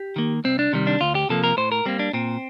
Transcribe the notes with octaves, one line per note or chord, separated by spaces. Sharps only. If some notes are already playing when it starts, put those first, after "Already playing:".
Already playing: G4
D#3 A#3
C2 C4
D4
C3 D#3 G3
D4
D2 F4
G4
C3 F3 A#3 A4
A#4
A2 C5
A#4
G3 A#3 C4
D4
A#2 C4